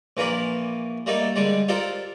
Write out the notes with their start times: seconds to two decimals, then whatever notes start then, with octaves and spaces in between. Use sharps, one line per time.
0.17 A#1 E3 A#3 A#4 D5 B5
1.06 G3 A3 A#3 D#4 A4
1.36 D3 G3 G#3 D5
1.68 F4 G4 A4 A#4 C5 D5